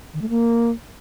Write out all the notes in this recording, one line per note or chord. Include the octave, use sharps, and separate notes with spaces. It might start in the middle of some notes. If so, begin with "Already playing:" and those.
D#3
A3
A#3